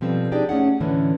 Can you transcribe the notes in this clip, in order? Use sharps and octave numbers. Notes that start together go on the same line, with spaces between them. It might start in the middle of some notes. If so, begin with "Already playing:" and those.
B2 F3 G3 C4 A4
D4 D#4 G4 G#4 D5
A3 C#4 G#4 F#5
A2 D3 E3 C#4